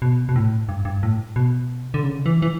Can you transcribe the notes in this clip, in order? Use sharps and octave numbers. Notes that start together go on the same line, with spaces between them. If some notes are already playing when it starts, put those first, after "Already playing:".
B2
B2
A2
G2
G2
A2
B2
D3
C#3
E3
E3